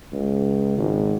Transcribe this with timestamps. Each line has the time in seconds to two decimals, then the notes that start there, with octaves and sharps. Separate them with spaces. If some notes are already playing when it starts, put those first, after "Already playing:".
0.12 C#2
0.78 G#1